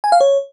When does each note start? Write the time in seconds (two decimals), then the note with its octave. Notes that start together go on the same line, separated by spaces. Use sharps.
0.04 G#5
0.12 F5
0.21 C#5